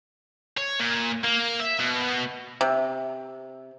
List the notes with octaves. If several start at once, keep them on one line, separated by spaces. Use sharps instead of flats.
C#5
A#2
A#3
E5
B2
C3